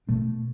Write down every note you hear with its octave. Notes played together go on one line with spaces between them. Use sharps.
B2 A3 D4